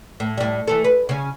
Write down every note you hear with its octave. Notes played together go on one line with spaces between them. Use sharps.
A2
A2 G3
E3 A3 A4
B4
C#3 C#4